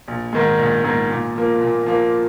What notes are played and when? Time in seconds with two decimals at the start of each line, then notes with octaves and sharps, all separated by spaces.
0.08 A#1
0.33 G#2 D#3 G#3
0.59 A#1
0.84 G#2 D#3 G#3
1.10 A#2
1.36 F3 A#3
1.61 A#2
1.86 F3 A#3